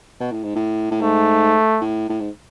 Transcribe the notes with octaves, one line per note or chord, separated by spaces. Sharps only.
B2
A2
G#2
A2
A2
G#2 A3
A2
A2
G#2